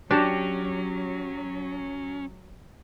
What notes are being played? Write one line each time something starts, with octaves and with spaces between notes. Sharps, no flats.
F#3 C#4 D4 F#4 G4